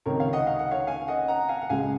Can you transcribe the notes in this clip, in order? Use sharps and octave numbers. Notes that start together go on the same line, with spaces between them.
C#2 C3 D#3 A#4 C#5
C#5 F5
D#5 F#5
F5
F#5
C#5 F5
F5 G#5
D#5 F#5
F#5 A#5
F5 G#5
F#5
C#2 C#3 G#3 F5 G#5